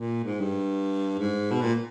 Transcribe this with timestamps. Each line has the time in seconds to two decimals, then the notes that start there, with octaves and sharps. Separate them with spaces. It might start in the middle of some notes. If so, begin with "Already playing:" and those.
Already playing: A#2
0.24 G#2
0.40 G2
1.19 G#2
1.51 B2
1.62 A#2